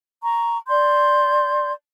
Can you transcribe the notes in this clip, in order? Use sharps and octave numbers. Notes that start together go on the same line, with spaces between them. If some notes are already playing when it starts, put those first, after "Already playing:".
A#5 C#6
D5 C6 G6